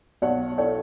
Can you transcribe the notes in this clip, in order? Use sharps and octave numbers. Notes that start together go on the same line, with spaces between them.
B1 C#5 F#5
E4 A4 C#5